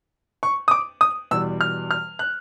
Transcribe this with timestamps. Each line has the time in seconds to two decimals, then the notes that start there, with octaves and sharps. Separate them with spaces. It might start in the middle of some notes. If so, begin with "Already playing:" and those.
0.43 C#6
0.68 D#6
0.71 D6
1.01 D#6
1.31 E2 B2 G3 E6
1.61 F6
1.91 F6
2.19 F#6